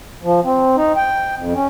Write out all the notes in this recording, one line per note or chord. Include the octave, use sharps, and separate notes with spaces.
F3
C4
D#4
G5
F2
C#4